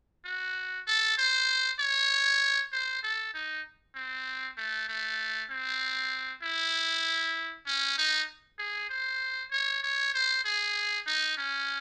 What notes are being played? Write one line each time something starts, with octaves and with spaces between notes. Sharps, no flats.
F#4
A4
C5
C#5
C5
A4
D#4
C4
A3
A3
C4
E4
C#4
D#4
G#4
C5
C#5
C#5
C5
G#4
D#4
C#4